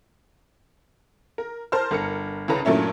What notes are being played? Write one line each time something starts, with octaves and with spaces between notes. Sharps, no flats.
A#4
A#4 C5 A5 F6
G1 A#4 F6 C#7
C2 C#3 C#4 A4 B4 A#5
G2 A#2 F#3 A3 C#4 E4